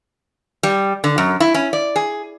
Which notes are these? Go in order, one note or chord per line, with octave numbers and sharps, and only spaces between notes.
G3
D3
F#2
E4
C#4
D5
G#4